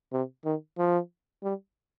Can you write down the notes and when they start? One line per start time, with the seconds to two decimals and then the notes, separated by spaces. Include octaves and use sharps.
0.12 C3
0.45 D#3
0.78 F3
1.43 G3